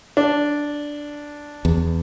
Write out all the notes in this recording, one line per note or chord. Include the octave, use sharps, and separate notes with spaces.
D4
E2